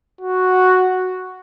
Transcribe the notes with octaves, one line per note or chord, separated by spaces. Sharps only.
F#4